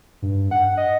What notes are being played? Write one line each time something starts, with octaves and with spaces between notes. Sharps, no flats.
G2
F#5
D#5